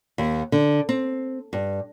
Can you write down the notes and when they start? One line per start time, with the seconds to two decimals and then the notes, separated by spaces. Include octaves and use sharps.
0.18 D#2
0.52 D3
0.89 C4
1.53 G2